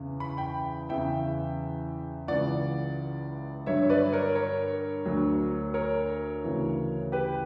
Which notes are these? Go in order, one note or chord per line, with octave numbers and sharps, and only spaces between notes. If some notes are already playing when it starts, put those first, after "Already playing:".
Already playing: E2 C#3 E3
B5
G5 B5
E2 C#3 E3 E5 G5
C#2 C#3 E3 D5 F#5
G2 D3 F#3 C#5 E5
C#5
B4 D5
A#4 C#5
A#4 C#5
D2 D3 F#3
A#4 C#5
D2 C#3 E3
G4 B4